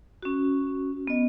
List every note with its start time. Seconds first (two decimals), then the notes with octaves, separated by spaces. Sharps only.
0.22 C#4 F#4
1.07 B3 D#5